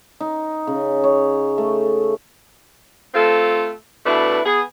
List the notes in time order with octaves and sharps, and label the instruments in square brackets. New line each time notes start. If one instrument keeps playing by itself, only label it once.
[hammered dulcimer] D#4
C#3
C#5
A3
[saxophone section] A3 C4 F4 A4
B2 A3 D4 E4 B4
B3 G#4